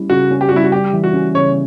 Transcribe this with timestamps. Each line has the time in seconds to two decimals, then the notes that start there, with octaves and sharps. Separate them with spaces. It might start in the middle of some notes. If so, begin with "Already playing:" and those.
Already playing: G3 C#4 E4
0.10 C#3 F#4
0.31 C#4
0.41 G4
0.49 F#4
0.52 G3 E4
0.64 F#4
0.72 G3 G4
0.93 E3
1.04 F#4
1.13 C#4
1.34 C#3 C#5